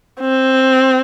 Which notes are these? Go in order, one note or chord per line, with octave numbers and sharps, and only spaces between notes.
C4